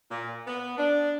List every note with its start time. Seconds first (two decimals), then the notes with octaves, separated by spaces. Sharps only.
0.11 A#2
0.48 B3
0.78 D4